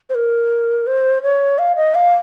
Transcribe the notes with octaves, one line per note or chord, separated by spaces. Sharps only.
C5
A#4
C5
C#5
F5
D#5
F5